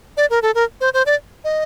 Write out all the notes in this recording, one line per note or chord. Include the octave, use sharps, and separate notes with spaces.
D5
A#4
A4
A#4
C5
C5
D5
D#5